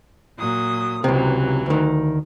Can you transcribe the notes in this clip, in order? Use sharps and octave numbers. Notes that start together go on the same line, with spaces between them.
A#2 F#3 D#6
C#2 C3 E3 F#3
D2 D#3